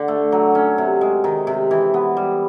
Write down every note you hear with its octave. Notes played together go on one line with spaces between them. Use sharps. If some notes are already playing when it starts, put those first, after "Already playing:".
Already playing: D3
A3
F#3
C#4
C3
G#3
D#3
C3
E3
B3
G3